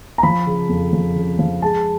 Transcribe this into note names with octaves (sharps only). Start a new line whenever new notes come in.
A#5
F3 B5
C#3
F2
F3
C#3
F3
G#3 A5